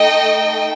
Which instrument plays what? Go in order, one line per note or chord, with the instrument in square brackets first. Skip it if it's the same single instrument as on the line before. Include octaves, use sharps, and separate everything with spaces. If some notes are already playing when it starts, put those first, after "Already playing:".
Already playing: [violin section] A3 D#4 A4 D#5 G5